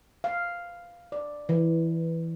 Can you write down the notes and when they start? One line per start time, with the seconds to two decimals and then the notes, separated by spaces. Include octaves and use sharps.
0.24 F5
1.12 D5
1.49 E3